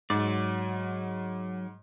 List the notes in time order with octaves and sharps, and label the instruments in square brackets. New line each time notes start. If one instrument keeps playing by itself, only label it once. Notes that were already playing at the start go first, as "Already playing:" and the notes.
[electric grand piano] G#2 [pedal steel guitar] F#3 D5